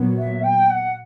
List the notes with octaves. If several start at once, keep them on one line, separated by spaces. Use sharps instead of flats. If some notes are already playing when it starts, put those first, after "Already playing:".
Already playing: A#2 F#3 B3
E5
G5
F#5